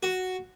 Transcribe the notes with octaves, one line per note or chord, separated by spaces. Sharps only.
F#4